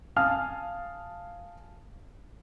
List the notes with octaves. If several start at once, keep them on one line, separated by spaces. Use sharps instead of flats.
F5 G#5 A5 D#6 F6